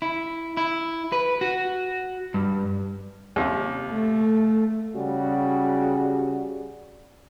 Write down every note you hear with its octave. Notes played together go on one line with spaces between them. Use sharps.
E4
E4
B4
F#4
G2
D#2 C3
A3
C#3 G3 F#4 G#4